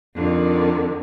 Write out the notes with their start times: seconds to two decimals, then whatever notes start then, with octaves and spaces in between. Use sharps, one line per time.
0.15 F2 D3 D#3